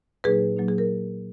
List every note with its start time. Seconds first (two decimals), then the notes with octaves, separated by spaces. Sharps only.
0.24 A#2 F#3 A#3 D#4 G#4 B4
0.57 A#2 F#3 A#3 D#4
0.68 G#4
0.78 A#4